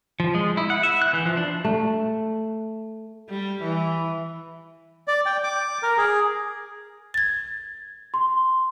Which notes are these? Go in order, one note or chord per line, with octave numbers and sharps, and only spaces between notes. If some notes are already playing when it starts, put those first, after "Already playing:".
F3
G#3
E4
F#5
E5
F#6
E3
F3
D4
A3
G3
E3
D5
G5
D6
A#4
G#4
G#6 A6
C6